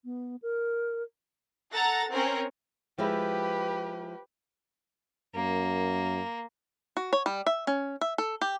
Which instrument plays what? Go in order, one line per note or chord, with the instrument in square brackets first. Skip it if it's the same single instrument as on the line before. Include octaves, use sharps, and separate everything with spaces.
[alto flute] B3
A#4
[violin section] A4 F#5 A#5 A6 A#6
C4 C#4 A#4
[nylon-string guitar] F3 G#3 E4 [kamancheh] G4 B4
[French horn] F#2 [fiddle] A#3
[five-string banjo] F#4
C#5
G3
E5
C#4
E5
A4
G4